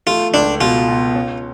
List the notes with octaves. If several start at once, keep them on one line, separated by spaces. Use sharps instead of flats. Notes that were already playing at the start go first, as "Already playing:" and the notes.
A3 F4
C#2 D4
B2 F4
B2
C#4